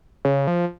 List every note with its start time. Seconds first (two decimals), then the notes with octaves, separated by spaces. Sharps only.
0.25 C#3
0.47 F3